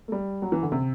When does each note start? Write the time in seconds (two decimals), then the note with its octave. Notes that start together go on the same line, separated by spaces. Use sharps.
0.08 A3
0.12 G3
0.42 F#3
0.52 E3
0.63 D3
0.72 C3